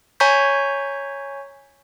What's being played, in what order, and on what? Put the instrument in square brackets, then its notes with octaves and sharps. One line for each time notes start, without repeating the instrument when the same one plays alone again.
[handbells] C#5 G#5 A#5 C#6 G6 B6